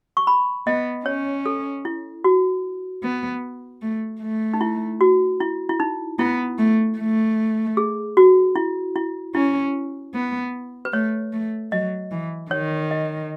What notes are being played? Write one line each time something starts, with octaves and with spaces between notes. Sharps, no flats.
C#6
B5
B3 D#5
C#4 C#5
A4
E4
F#4
B3
A3
A3
D#4
E4
F#4
E4
E4
D#4
B3 E4
A3
A3
G#4
F#4
E4
E4
C#4 E4
B3
B4
A3 C#5
A3
F#3 D#5
E3
D#3 C#5
D#5